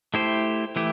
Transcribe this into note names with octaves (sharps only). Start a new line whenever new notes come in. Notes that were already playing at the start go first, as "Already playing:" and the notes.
A3 E4 G4 C5
E3 A3 E4 G4